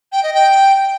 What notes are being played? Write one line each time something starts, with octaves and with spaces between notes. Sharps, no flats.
G5
D#5
G5